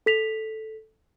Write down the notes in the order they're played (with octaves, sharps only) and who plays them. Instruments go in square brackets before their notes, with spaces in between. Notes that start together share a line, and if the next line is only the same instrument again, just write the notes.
[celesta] A4 B6 F7